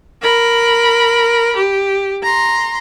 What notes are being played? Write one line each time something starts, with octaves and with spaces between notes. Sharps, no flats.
A#4 B5
G4
A#5 C6